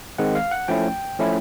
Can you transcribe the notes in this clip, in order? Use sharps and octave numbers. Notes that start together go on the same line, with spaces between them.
D#3 G#3 C4 F#5
F5
F#5
F3 A3 C#4 E4 G5
F3 A3 C#4 E4